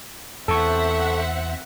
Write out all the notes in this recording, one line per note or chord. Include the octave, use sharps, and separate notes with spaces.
E2 C4 A4 E5 F#5 C#6